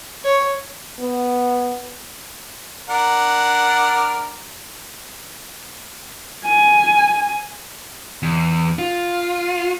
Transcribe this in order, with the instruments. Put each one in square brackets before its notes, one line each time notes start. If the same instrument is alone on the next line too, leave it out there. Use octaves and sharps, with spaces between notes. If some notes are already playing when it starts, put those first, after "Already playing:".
[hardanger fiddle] C#5
[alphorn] B3
[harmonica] D4 A#4 F#5
[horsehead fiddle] G#5
[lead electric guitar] E2
F4